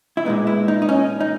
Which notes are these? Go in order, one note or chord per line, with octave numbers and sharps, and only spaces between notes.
E4
A#2 G#3 B3 D#4
E4
D#4
D#4
C#4
D#4